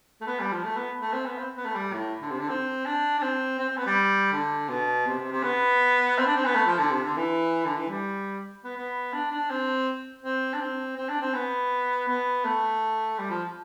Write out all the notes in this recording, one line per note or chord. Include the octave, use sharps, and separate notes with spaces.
A3
B3
G3
F3
A3
B3
A3
C4
B3
C4
B3
A3
G3
A2
D3
C3
D3
C4
D4
D4
C4
C4
C4
B3
G3
D3
B2
C3
C3
C3
B3
C4
D4
C4
B3
A3
F3
D3
C3
D3
E3
D3
E3
G3
B3
B3
D4
D4
C4
C4
D4
C4
C4
D4
C4
B3
B3
A3
G3
F3